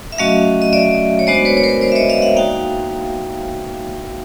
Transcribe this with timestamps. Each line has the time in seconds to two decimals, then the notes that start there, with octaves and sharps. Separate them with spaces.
0.12 E5
0.18 F#3 A3 C#4 F#4 D#5 F5
0.62 D#5
0.73 D5 E5
1.19 C#5
1.27 G#3 B3 D4 F#4 C5 D5
1.45 B4 C#5
1.57 C#5
1.63 A#4 C5
1.81 C5 D5
1.92 E5
1.95 C#5 D#5
2.10 D#5 F5
2.22 E5 F#5
2.36 A#3 D#4 F#4 F5 G5